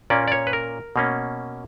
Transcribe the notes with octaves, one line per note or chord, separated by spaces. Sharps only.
A#2 A#3 C#4 D5
D5
C#5
B4
A#4
B2 A#3 C#4